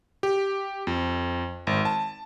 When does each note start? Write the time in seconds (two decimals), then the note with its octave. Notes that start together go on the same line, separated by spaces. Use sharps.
0.23 G4
0.87 F2
1.67 G#1
1.85 A5